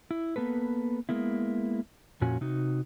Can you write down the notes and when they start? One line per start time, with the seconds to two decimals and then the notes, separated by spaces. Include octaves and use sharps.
0.11 E4
0.36 A#3 B3 A4 B4
1.09 G#3 A#3 B3 E4
2.21 F2 A#2 C#4 F#4 G#5
2.41 C3 D#4 F#4